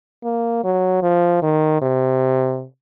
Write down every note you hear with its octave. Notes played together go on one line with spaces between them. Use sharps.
A#3
F#3
F3
D#3
C3